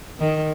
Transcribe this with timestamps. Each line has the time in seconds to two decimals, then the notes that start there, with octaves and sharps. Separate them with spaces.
0.20 D#3